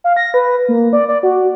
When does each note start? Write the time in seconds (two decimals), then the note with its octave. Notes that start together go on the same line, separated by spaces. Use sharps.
0.04 F5
0.17 A#6
0.34 B4
0.69 A#3
0.93 D5
1.08 D5
1.23 F#4